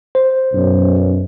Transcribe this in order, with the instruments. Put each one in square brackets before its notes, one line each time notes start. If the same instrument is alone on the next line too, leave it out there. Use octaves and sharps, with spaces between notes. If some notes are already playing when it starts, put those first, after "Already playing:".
[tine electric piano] C5
[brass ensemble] B1 F#2